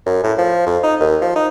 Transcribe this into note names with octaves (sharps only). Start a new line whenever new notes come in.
F#2
A2
F3
F2
D#4
D#2
F3
D#4